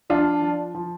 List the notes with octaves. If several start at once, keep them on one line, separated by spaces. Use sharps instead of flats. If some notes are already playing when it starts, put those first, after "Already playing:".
F3 D4 F4
F3
F3